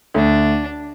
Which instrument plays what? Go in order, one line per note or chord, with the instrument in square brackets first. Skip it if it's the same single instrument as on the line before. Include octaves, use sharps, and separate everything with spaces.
[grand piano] D2 [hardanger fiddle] D4